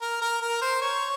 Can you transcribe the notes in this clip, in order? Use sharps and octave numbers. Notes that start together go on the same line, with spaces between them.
A#4
A#4
A#4
C5
C#5